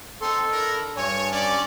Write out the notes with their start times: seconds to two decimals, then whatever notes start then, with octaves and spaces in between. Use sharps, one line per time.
0.21 C4 D#4 A4 C6
0.52 D4 E4 A#4
0.97 G2 C#5 G#5
1.31 C#4 D5